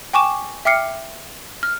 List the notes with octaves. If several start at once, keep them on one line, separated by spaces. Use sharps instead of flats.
G5 G#5 C#6 D6 E7
E5 G5 D6 F6 C7 C#7
F6